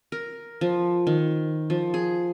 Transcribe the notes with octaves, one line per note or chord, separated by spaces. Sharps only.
A#4
F3
D#3
F3
G#4